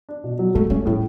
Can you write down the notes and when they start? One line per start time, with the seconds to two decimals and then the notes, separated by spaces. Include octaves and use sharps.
0.09 D4
0.24 B2
0.39 F#3
0.55 G#3 A3
0.70 G#3 C#4
0.86 A2 G3